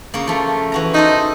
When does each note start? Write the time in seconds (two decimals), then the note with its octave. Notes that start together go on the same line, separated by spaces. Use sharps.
0.14 C#3 A#3
0.27 F3 A3
0.72 E3 F#4 A#5
0.94 D#4 F#4 A4 C5